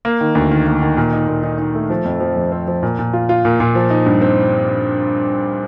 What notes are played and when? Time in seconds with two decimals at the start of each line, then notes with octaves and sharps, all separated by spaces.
0.05 A#3
0.21 D#3
0.35 D2
0.51 D#3
0.66 A#3
0.82 D#3
0.97 A#2
1.13 D#4
1.28 A#2
1.43 D#4
1.58 D#4
1.75 A3
1.90 F3
2.05 F2
2.20 F3
2.36 F2
2.52 C4
2.68 F3
2.83 A#2
2.99 A#2
3.13 F4
3.29 F4
3.45 A#2
3.60 A#2
3.75 F3
3.90 D#4
4.06 G2
4.21 C4